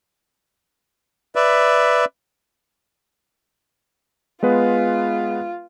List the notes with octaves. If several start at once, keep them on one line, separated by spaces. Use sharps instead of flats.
B4 D5 E5
G#3 B3 F4 B4